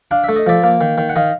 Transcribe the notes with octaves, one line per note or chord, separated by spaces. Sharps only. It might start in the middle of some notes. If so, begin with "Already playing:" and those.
D4 F5
A3 E5
D#5
F3 D5 E5
A#3
D#3
D#3
F#5
D#3 D#5 F5